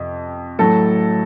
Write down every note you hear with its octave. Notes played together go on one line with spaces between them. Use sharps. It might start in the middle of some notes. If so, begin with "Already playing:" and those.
Already playing: F2 C3
A2 F#3 A3 A4